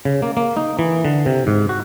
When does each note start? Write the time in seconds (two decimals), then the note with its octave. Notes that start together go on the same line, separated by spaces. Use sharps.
0.05 C#3
0.22 A#3
0.37 A#3
0.57 D#4
0.79 E3
1.05 D3
1.26 C3
1.47 G#2
1.69 F#4